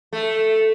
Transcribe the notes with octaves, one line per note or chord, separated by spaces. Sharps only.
A3